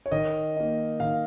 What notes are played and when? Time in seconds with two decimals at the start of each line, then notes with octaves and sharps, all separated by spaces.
0.06 C#5
0.12 D#3 D#5
0.56 A#3 D#4
1.00 D#3 F5